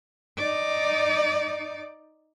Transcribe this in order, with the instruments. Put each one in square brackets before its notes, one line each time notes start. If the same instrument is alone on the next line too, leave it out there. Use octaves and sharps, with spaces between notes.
[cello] D#4 D5